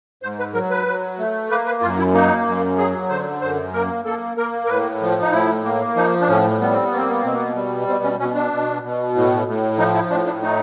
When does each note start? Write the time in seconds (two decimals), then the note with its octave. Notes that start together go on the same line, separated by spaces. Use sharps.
0.23 G#2 C5
0.39 B4
0.54 F#3 A#4
0.70 B4
0.87 F#3
1.19 A3
1.50 A#3 B4
1.66 B4
1.82 F#2 F4
1.99 E4
2.14 A#3 D#4
2.46 F#2
2.78 F#3 G#4
3.10 D3 C5
3.41 F#2 C5
3.73 A#3 A#4
4.05 A#3 A4
4.37 A#3 A#4
4.65 A#4
4.69 A2 B4
5.01 F3
5.21 D#4
5.32 A2 E4
5.64 A#3
5.96 F3 D#4
6.21 D4
6.28 A2 C#4
6.60 G3 B3
6.72 C4
6.85 B3
6.92 A#3
6.97 C4
7.10 B3
7.21 B2 C4
7.34 B3
7.56 G3
7.87 B2 C4
8.04 C#4
8.19 B2 C#4
8.35 D4
8.52 B2
8.83 B2
9.15 A2
9.47 A2
9.78 F3 D#4
9.95 E4
10.11 A2 D4
10.26 D4
10.42 A3 D#4